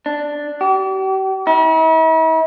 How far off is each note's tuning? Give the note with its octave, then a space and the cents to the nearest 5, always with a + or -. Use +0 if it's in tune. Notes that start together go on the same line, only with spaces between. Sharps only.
D4 +0
G4 -40
E4 -45